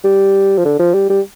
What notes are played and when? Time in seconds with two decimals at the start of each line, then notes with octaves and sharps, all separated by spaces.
0.04 G3
0.58 F3
0.65 D3
0.79 F3
0.94 G3
1.10 G3